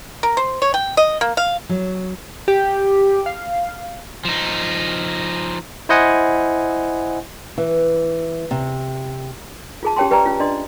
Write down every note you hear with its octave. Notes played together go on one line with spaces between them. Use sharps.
A#4
C5
C#5
G5
D#5
A#3
F5
F#3
G4
F5
F3 D#4
E4 C5 D#5 F#5 G#5
E3
C3
F4 G#4 A5
C#4 G4 C#5 G5 A5 C6
G4 B4 D5 G5 A#5
C#4 F4
D4 D5 D#5 C6